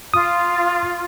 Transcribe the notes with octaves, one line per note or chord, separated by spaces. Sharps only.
F4 D#6